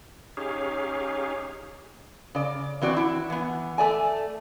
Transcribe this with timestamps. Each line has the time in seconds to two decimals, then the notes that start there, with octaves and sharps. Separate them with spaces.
0.37 C#4 D#4 G4 G#4 C#5 F5
2.35 C#3 D5
2.81 E3 C4 F#4 D5
2.96 E4
3.30 E3 B3
3.78 A3 D5 G#5